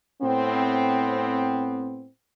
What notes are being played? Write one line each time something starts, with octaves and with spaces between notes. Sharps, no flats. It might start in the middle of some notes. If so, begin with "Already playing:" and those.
A2 B3 C4